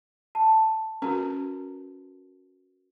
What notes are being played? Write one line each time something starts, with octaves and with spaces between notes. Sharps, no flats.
A5
C#4 F#4 A#4 B4